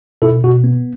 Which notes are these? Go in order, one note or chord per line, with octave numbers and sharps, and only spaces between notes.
B2 E4 A4
B2 F#4
B3